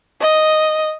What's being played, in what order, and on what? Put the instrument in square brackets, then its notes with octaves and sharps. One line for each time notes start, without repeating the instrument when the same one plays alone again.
[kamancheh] D#5